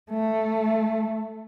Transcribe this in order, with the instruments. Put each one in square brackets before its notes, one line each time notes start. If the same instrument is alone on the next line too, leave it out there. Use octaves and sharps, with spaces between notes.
[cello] A3